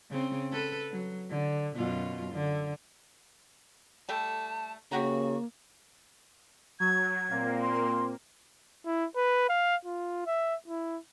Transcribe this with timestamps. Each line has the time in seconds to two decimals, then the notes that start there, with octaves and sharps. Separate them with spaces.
0.10 C#3 C4
0.51 A4 B4
0.91 F#3
1.30 D3
1.75 F#2 B2 F4
2.33 D3
4.09 G3 A3 G5 A5
4.92 C#3 A#3 F#4 G4 F#5 A#5
6.80 F#3 G#6
7.31 A#2 A#3 C4
7.61 C6
8.86 E4
9.16 B4
9.49 F5
9.85 F4
10.26 E5
10.68 E4